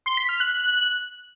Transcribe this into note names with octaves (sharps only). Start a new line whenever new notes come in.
C6
B6
F6
F#6